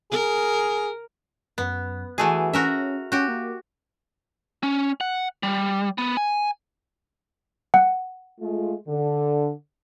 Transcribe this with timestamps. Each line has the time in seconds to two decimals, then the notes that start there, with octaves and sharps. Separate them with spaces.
0.12 G#4 A#4
1.58 F#2 B3
2.18 E3 A3 F#4 G#4
2.53 C#4 F#4 A#4 E5
3.12 C#4 F#4 G4
3.28 A#3
4.63 C#4
5.01 F#5
5.43 G3
5.98 B3
6.17 G#5
7.74 F#5
8.40 G#3 A3 F4
8.88 D3